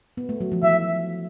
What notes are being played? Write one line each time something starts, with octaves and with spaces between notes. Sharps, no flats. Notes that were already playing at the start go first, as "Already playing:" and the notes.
B3
A3
F#3
F3
E3 E5